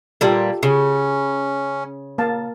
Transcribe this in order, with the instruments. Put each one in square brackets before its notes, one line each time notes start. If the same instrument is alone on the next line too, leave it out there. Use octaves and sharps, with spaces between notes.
[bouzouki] A#2 G3 A#3 [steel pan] F4 G4 A4
[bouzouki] C#3 [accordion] C#4
[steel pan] A#3 F5 A5